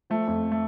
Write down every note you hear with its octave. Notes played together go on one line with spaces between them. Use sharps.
F3 A3
F2
A3